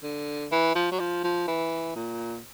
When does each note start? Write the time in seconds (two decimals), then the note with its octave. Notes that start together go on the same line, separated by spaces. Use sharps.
0.03 D3
0.52 E3
0.75 F3
0.92 F#3
1.00 F3
1.24 F3
1.48 E3
1.96 A#2